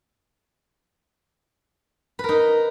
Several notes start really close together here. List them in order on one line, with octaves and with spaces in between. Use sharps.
B4 A#4 D#4